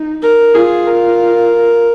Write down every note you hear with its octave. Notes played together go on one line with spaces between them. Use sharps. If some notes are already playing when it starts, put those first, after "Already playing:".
Already playing: D#4
A#4
F4 G#4
A#4